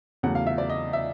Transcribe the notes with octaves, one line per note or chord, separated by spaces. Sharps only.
E2 C#3 F#3 A3 F#5
F5
E5
D5
D#5
E5